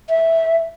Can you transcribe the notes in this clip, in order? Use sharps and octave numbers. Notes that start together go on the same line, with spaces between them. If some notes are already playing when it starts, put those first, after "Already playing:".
E5